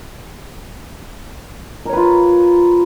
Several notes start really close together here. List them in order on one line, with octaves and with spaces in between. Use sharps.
A#4 C#5 B4 F4